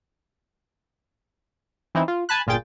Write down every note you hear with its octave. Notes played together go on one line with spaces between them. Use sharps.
E3 C4 D#4 E4
F4
G#5 A5 B5 F#6
G1 A#2 F4 G#4 G5 A6